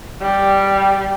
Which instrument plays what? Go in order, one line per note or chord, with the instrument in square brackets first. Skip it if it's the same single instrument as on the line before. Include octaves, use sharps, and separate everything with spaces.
[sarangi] G3